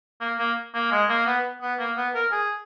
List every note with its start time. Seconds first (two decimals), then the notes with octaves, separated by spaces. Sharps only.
0.21 A#3
0.39 A#3
0.75 A#3
0.91 G#3
1.09 A#3
1.27 B3
1.62 B3
1.79 A#3
1.97 B3
2.15 A#4
2.32 G#4